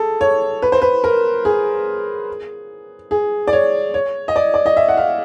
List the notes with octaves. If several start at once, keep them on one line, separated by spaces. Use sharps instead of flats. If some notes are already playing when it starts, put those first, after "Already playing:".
Already playing: G#4 A4
C#5
B4
C5
B4
A#4
G#4
G#4
D5
C#5
C#5
D#5
D5
D5
D#5
E5
F#5
F5